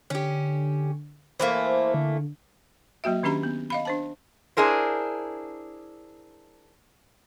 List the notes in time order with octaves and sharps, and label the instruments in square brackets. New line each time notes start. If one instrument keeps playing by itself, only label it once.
[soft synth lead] D3 [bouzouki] C#4 G4
[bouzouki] E3 A3 A#3 [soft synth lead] C5
[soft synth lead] D3
[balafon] F#3 A#3 F#4 E5
D#3 C#4 D4 G4 A#5 B5
B3
D#5 F5 B5
D4 C5 A5
[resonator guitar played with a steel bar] D4 E4 G#4 A#4 C5